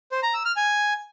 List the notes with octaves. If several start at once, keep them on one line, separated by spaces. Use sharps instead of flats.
C5
A#5
E6
F6
G#5